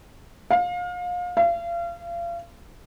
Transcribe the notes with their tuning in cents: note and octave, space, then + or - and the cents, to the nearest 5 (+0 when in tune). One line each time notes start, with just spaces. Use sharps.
F5 +30
F5 -35